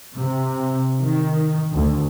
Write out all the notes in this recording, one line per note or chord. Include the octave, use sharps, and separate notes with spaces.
C3
D#3
D2